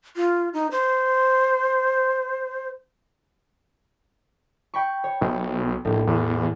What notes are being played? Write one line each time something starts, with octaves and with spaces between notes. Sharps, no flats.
F4
D#4
C5
G5 B5 C#6
C#5
B1
A#1 A2
E2